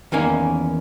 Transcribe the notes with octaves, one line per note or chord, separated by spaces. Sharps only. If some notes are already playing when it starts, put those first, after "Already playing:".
E2 D#3 A#3 C#4